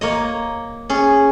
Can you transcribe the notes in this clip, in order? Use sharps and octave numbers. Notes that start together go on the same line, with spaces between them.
A#3 C#5 D#5
C#4 G#4